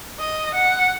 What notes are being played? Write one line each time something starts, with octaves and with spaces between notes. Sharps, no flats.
D#5
F#5